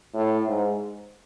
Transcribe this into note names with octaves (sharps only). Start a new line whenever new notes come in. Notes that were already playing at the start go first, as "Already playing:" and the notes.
A2
G#2